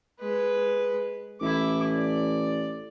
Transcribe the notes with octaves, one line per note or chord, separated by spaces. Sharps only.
G#3 B4
A1 E4 D6
D5